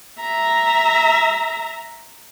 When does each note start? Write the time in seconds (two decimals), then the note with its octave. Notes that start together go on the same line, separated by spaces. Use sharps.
0.20 E5 A#5